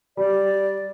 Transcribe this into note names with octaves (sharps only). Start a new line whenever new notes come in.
G3 D5